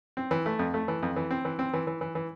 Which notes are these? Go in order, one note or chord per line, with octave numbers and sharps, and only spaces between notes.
C4
E3
A3
F2
A3
E3
F2
E3
C4
E3
C4
E3
E3
E3
E3